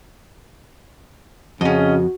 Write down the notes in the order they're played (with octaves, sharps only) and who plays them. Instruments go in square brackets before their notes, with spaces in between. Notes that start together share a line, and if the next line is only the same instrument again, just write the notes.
[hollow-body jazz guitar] F2 [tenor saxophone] C#3 [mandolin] C#4 D#5 [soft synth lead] F#4